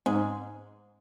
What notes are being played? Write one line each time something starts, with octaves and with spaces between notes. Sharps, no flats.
G#2 G#3